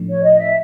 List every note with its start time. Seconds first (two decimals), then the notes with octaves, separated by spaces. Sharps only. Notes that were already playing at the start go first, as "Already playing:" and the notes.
Already playing: A2 F3 A3 D4
0.10 C#5
0.24 D#5
0.39 E5